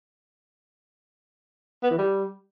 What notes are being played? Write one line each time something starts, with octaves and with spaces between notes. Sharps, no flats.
B3
E3
G3